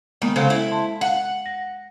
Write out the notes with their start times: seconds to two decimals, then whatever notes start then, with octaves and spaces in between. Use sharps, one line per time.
0.22 D#3 G#3 A#3 B3
0.36 C#3 F#3 C4 A4 C5 F5
0.50 E4
0.71 A5 C6
1.01 F5 F#5
1.46 A#6